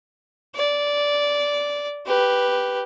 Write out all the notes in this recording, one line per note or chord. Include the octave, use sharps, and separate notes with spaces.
D5
G4 B4